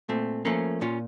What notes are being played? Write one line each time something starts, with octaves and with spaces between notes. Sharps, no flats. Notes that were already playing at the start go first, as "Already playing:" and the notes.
A#2 A3 C4
F3 A3 A#3 C#4
A#2 C#4 F4